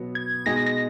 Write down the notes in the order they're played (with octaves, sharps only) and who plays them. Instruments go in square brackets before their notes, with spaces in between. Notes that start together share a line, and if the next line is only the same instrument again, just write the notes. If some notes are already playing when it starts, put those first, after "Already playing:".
Already playing: [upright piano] B2 F#3 B3
[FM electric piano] G#6
[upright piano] B2 G#3 D#4 G#4 [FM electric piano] A#6
[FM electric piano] A#6